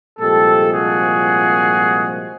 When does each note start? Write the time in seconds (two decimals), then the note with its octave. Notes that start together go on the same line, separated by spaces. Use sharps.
0.20 C2 A#2 F3 G#3 G4 A4
0.72 F#4 G#4